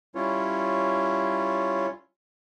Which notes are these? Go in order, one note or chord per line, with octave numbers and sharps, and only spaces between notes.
G3 C#4 E4 F4 C#5